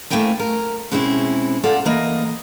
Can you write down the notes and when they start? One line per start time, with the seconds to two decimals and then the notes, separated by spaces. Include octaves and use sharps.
0.10 A3 A#3 E4 C5 G5 G#5
0.40 A#4
0.92 B2 G#3 C4 C#4 E4
1.64 F4 A4 D5 F#5
1.85 E3 A#3 D#5